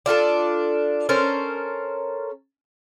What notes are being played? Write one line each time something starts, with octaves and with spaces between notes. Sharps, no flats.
D4 F4 G4 A4
C#4 A4 A#4 C5